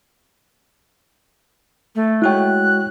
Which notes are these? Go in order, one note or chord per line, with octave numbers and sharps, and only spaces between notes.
A3
G#3 E4 F#4 C#5 G5 F#6